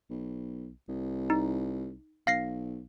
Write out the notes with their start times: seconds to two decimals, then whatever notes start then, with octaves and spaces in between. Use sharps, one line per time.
0.10 B1
0.88 C2
1.30 D#4
2.27 B1 F5 A#6 C7